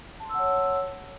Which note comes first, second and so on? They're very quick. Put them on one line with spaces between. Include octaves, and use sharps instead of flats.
A5 C6 E6 F#5 C#5